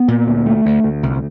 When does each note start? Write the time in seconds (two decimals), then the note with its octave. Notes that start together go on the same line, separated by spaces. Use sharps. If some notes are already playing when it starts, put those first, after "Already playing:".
Already playing: B3
0.08 A#2
0.27 D2
0.46 A3
0.65 D2
0.84 D2
1.03 C2